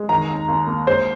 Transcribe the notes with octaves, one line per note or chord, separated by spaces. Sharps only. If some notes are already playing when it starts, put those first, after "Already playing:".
Already playing: G#3
D#3 A#5
D#2
D#2
A#3
G#3 C5